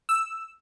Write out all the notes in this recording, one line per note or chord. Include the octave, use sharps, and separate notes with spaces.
E6